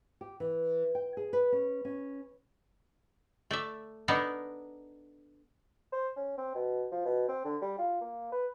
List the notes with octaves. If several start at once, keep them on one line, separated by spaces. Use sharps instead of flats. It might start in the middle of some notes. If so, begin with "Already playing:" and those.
G4
E3
G5
G#4
B4
C#4
C#4
A3 D5 E5
B3 D4 D#4 A4 A#4
C5
C#4
C4
B2
F3
B2
C4
D3
G3
F4
A#3
B4